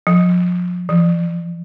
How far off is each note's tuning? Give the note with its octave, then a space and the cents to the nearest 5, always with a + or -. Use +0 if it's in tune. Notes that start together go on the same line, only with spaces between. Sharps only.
F3 +35
F3 -45